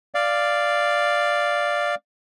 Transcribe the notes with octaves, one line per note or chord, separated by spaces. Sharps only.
D5 F5